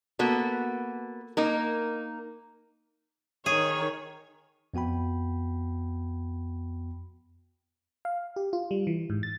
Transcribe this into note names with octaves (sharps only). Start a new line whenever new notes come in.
A#3 B3 F#4 A4
A#3 D#4 A#4
D#3 G#4 C#5
F2 B3 F#4 G5 B5
F5
G4
F4
G3
E3
G#2
A6